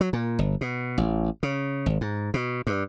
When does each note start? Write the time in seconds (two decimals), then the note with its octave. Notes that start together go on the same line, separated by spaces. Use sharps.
0.01 F#3
0.13 A#2
0.39 G1
0.61 B2
0.98 A1
1.43 C#3
1.86 G#1
2.01 G#2
2.34 B2
2.67 G2